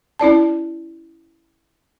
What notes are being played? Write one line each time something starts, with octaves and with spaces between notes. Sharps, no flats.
C#4 E4 D5 A5